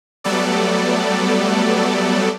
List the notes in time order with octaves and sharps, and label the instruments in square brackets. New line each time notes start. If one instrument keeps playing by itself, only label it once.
[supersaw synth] F#3 G3 A3 B3 A4 D5